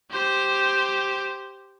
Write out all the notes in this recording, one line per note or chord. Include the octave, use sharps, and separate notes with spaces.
G4 C5